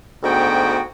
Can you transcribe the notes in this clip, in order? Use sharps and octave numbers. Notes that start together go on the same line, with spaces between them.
D2 G#2 B3 F#4 G5